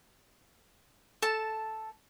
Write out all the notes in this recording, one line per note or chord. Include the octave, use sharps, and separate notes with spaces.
A4 A5